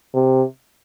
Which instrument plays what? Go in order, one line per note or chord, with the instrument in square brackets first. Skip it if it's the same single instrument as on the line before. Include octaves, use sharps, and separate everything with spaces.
[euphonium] C3